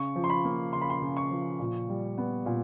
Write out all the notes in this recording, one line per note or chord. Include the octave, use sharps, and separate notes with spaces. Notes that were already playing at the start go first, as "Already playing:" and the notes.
Already playing: C#3 C#6
F3
C6
B5
A#3
C#3 C6
B5
C6
C#3
C#6
F3
A#2
G3
B3
A#2